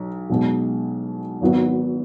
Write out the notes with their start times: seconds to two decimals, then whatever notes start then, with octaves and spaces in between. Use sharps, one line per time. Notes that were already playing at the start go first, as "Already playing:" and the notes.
Already playing: B1
0.30 B1 B2 G#3
1.41 G#1 G#2 F#3 B3